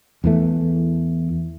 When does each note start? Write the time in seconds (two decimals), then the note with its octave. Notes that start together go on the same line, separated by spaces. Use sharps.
0.24 E2 E3 A3